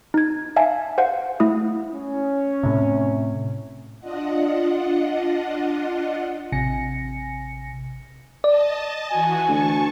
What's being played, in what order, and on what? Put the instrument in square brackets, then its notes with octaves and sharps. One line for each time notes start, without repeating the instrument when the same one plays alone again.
[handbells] D#4 G#6
E5 F5 G#5 A5
C5 F5 F#5
A3 E4 D#6
[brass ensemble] C#4
[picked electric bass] A2 C3
[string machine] D4 F4 D#5 F#5
[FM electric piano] A1 C3 G#5 A#6 C#7
[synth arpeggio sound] D5 [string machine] D#5 A5
[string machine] E3 F#4 [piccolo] G#5
[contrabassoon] D2 [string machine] A5 C#6